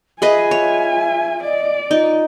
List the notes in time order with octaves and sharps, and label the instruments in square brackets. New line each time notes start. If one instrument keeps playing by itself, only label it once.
[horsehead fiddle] F4 G#5 [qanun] G#4 B4 D#5 [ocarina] E5
[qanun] C#5 [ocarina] E5
[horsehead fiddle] D5 [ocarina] D#5
[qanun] D#4 [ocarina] F4